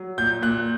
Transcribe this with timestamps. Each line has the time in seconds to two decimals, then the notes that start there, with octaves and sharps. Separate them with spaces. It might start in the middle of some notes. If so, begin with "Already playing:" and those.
Already playing: F#3
0.18 A#2 G6
0.42 A#2 F#6